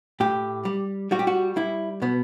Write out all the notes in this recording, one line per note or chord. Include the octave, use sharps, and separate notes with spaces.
A2 G4
G3
G3 F#4
G4
F#4
G3 E4
B2 B3